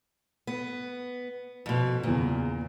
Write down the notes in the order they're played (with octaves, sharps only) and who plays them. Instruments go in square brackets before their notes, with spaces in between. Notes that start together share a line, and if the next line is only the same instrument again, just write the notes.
[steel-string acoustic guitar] B3
F2 B2
[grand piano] E2 C#3 [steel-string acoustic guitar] A#2